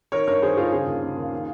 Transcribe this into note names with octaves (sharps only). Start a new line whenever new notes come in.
D#3 A#4 C#5
G2 A#4 C#5
D#3 G#4 C5
G2 F4 G#4
C#3 F4 G#4
D#2
C#3
D#2
D#3